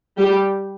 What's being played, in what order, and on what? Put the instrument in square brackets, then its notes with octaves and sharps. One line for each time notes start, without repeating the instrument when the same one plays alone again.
[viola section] G3 G4